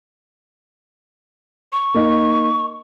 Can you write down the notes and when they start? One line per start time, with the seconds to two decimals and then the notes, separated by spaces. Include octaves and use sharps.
1.73 C#6
1.94 A#3 D#4